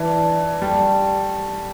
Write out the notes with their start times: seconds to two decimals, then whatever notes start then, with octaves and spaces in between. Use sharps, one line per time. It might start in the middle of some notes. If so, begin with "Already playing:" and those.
Already playing: E3 D4
0.09 D5
0.27 D5
0.44 D5
0.62 G3 A3
0.79 A3